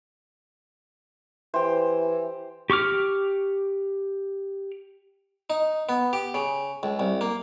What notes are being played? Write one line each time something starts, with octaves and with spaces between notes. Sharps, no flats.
E3 G4 C5
G4 C#6 D6 F6
D#4
B3
G4
C#3
C#2
C2
A#3